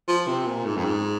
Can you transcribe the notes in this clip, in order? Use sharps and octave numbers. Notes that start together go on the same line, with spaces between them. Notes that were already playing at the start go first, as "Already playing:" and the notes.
F3
C3
A#2
G#2
F2
G#2